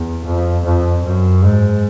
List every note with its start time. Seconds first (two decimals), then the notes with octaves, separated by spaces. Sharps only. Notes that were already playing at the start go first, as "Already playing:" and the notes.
Already playing: E2
0.25 F2
0.65 F2
1.04 F#2
1.43 G#2